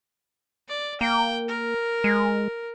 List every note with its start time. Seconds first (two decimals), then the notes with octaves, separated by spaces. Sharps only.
0.68 D5
1.01 A#3 G5
1.48 A#4
2.04 G#3